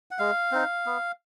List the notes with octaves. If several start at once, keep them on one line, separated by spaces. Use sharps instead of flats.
F#5
G#3 F5
C4 D#4
B3